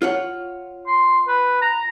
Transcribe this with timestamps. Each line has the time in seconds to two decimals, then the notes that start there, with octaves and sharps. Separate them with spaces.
0.02 F4 C#5 F#5
0.86 C6
1.27 B4
1.62 A#5